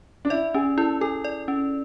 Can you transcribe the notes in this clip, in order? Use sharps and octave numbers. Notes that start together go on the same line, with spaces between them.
D4
E4 D5
C#4 G#4
E4 A4
G#4 A4
D5
C#4